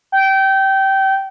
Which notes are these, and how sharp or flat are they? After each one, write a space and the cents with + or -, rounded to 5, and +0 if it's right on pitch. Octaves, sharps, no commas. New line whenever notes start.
G5 -20